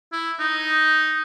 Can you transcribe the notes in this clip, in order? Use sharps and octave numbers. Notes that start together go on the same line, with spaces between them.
E4
D#4